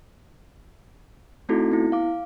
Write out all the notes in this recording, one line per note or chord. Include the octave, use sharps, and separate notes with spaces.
A3 C4 D#4 E4 F#4 A4
B3 E4
F5 D6